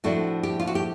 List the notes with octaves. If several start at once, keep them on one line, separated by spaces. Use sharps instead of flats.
A2 F3 A3 D4 F#4
G4
F4
F#4
G4